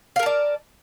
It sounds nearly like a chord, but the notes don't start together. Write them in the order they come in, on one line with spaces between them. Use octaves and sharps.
F5 A#4 A5 D5